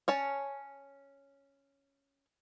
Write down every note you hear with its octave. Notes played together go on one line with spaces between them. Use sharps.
C#4 C#5 A5